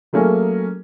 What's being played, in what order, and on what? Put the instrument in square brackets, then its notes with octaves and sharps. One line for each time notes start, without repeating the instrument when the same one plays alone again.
[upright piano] F#3 A3 A#3 C#4 G#4 A#4